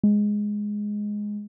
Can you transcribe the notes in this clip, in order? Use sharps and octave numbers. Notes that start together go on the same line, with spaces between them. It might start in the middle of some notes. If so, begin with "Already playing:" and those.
G#3